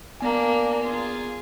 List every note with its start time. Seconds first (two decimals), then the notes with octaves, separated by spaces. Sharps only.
0.21 A#3 B3 D4 G#5
0.81 F4 G#4